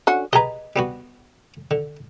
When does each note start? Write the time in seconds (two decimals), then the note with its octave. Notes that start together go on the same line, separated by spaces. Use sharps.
0.07 D3 C#4 F#4
0.33 G4 G#4 B4 D#5 A#5
0.76 G3 B3 F#4
1.71 D3